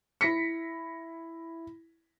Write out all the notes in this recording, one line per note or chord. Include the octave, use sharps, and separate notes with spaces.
E4 A#6 B6 C#7